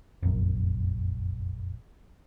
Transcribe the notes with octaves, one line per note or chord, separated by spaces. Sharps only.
F1 A#1 F#2